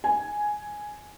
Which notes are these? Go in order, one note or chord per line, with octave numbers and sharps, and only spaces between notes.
G#5